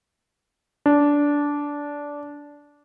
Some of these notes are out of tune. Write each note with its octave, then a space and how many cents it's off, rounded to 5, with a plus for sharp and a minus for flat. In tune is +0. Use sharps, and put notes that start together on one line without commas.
D4 -15